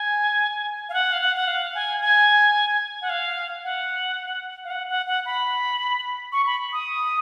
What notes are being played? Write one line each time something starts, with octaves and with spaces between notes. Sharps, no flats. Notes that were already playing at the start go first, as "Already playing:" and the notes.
Already playing: G#5
F5
F#5
F5
F#5
F#5
F5
G#5
G#5
F#5
F5
F#5
F5
F#5
F#5
F#5
B5
C#6
B5
D#6